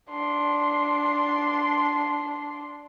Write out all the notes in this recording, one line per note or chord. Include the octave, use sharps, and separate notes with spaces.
D4 C6